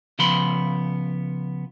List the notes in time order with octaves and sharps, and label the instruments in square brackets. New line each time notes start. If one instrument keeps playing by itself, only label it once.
[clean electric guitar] C#3 F3 B3 B5 C6